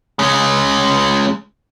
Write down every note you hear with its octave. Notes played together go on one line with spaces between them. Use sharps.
G#3 C#4